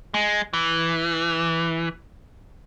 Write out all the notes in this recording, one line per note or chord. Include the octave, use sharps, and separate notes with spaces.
G#3
E3